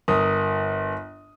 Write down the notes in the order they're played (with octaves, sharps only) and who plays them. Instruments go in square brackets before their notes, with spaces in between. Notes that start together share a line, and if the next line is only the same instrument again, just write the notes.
[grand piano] G1 A#4 D#6